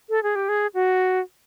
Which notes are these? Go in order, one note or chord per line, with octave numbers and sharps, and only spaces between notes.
A4
G#4
G4
G#4
F#4